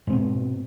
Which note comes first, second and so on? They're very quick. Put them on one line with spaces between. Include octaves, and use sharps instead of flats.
G#2 C4 B2